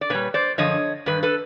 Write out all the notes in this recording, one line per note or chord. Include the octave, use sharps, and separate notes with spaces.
D5
A#2 G3 B4 C#5
C5 D5
F#2 D3 F3 C#5 D#5
G2 D#3 B4
A4 B4